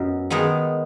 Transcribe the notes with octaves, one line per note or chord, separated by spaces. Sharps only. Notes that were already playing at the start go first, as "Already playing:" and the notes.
Already playing: F#2 F#3 B3 D#4
D#3 G#3 B3 D#4